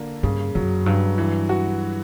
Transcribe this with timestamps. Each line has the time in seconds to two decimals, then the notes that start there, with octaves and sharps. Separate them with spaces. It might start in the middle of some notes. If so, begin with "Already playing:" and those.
Already playing: D3 A#3
0.23 G2 C#3
0.55 F#2 F#3
0.86 G2 F#3
1.18 E3
1.49 F#4